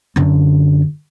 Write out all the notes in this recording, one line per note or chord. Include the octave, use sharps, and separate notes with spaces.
F#2 D3